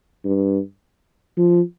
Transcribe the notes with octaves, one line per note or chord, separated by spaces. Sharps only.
G2
F3